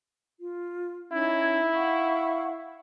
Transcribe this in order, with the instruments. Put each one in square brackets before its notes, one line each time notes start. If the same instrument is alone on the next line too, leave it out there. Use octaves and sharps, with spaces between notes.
[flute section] F4
[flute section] C#4 D#4 G#6 [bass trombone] E4
[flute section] F5 F#5 C#6